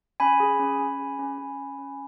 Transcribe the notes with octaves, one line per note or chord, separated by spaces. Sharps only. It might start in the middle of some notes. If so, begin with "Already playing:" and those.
C#4 G#5 B5
G#4
C#4
C#4
G#4
C#4
C#4
C#4
C#4